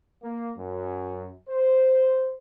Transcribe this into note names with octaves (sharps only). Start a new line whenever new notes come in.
A#3
F#2
C5